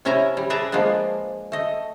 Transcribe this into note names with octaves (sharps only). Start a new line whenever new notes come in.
C3 C#4 E4 E5 G#5 A#5
G3
G#4 B4 D5 E5 A5 A#5
F3 G#3 A#3 B3 D4
A3 D#5